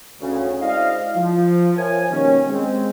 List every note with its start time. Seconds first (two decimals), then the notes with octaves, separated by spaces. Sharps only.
0.21 D2 C#3
0.61 G#3 E4 C5 D5 D#5 F5
1.16 F3
1.76 A#4 C5 C#5 E5 G#5
2.11 B2 D#3 G3 A#3 C#4
2.49 G#3 C4